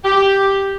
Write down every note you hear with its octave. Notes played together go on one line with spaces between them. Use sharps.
G4